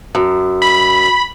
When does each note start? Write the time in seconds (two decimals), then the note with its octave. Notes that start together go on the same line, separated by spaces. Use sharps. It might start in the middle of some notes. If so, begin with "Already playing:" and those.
0.15 F#2
0.62 B5